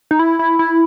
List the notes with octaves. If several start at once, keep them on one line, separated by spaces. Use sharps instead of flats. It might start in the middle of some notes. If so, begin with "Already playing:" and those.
D#4
E4
E4
E4